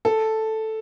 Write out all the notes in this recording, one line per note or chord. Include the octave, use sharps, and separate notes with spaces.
A4